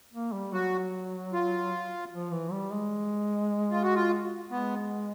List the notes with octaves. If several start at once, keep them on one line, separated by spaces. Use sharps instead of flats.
A#3
G3
F#3 F#4
F4
F3
E3
G3
G#3
F4
F#4
F4
G#3 B3